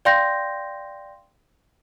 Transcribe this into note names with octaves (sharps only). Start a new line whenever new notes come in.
D5 F5 G5 C6 G6 A#6